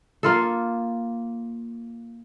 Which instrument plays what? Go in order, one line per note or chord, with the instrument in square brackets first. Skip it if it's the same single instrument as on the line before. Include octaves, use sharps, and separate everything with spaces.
[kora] A#3 F4 A4